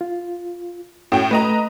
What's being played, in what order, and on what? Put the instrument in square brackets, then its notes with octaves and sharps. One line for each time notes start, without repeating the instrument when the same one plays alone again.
[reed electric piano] F4
[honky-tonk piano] A2 G5 [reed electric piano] C#4 F#4
[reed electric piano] A3 [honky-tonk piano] B4 D#5 A#5